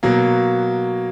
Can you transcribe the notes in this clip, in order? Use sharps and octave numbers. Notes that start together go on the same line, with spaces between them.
B2 F#3 A#3